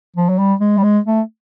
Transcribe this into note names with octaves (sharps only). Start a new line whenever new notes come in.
F3
F#3
G3
G#3
G3
G#3
A3